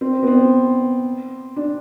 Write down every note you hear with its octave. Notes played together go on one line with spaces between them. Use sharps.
C4
B3
C4
D4